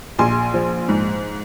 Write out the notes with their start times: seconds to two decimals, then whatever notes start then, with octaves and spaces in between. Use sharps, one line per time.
0.19 A#1 G#5 C6
0.54 F3
0.89 G#2